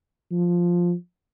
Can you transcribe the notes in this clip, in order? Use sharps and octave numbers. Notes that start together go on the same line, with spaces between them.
F3